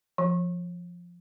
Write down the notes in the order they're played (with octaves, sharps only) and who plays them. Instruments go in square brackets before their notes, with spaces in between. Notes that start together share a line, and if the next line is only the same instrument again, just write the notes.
[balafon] F3